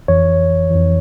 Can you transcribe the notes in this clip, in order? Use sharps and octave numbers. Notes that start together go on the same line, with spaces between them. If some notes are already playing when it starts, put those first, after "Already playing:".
F2 E3 C#5
F2 E3